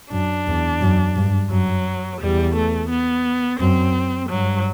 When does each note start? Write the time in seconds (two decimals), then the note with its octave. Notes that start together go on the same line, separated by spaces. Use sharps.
0.11 F#2 D4
0.47 E2
0.81 F#2
1.16 G2
1.50 F#2 F#3
2.20 E2 G3
2.55 A3
2.90 B3
3.60 F#2 C4
4.30 G2 F#3